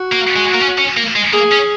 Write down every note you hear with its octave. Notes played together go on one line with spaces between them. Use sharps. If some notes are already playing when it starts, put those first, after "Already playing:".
Already playing: F#4
A#3
G#3
A#3
C#4
C#4
A#3
G#3
A#3 G#4
C#4